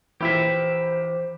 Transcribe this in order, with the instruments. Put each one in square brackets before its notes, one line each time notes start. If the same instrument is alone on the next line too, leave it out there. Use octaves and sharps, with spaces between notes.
[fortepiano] A#1 E4 [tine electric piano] E3 [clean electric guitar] G4 E5 [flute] C5